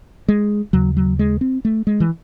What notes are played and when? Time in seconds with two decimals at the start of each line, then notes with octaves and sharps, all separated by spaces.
0.28 G#3
0.73 D#2 C#3 F#3
0.97 F#3
1.19 G#3
1.41 C4
1.65 A3
1.87 G#3
2.00 E3